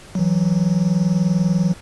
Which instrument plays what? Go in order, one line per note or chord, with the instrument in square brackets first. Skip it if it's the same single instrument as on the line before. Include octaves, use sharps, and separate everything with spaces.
[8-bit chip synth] E3 F#3